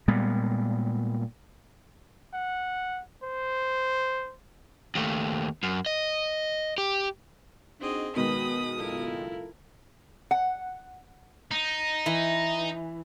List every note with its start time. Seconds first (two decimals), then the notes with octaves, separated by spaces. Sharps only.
0.08 A#2 G3 G#3 B3
2.34 F#5
3.23 C5
4.95 D#2 A3
5.63 F#2
5.86 D#5
6.78 G4
7.81 C4 D4 D#4 F#4 G#4 D#5
8.16 B2 D#3 G#3 B3 B4 D#5 B5 D#6
8.77 F#1 E4 F4 A4 A#4
10.31 F#5
11.51 D#4
12.06 E3